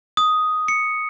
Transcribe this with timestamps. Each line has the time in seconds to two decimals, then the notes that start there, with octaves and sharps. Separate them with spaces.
0.17 D#6
0.68 C#7